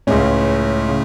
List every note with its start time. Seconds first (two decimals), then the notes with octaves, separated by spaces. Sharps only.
0.07 C#2 A2 C#3 G#3 A3 C#4
0.88 C#3